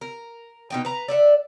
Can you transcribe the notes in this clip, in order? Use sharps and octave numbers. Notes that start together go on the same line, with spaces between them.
A#4
B2 D#4 G5
B4 A#5
D5 E5 F#5